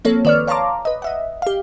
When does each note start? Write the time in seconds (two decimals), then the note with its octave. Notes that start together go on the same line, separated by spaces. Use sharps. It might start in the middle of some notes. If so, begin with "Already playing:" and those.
0.05 F3 A#3 C4 A4 C#5
0.25 D#3 B4 D5 C#6 F6
0.48 C#5 F5 A5 A#5 C6 D6
0.85 B4 D#5
1.02 D#5 E5 F#5
1.42 G4 F5